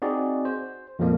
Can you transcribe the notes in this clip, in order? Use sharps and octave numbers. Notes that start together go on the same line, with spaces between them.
C4 D#4 F#4 G#4 D5
C5
F2 A#2 C#3 F3 G#3 A#3